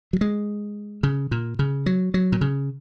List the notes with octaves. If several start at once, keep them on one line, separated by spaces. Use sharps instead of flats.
F#3
G#3
C#3
A#2
C#3
F#3
F#3
A#2
C#3